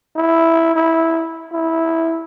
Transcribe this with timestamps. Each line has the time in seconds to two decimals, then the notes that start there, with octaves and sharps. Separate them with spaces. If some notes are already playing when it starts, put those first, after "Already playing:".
0.16 E4
0.76 E4
1.52 E4